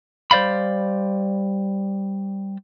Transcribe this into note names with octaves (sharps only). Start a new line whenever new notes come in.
G3 C5 D5 F5 B5